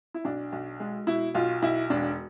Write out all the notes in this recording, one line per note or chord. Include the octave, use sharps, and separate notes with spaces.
E4
B1 D4
B1
G#3
B2 E4
B1 F4
B1 E4
E1 D4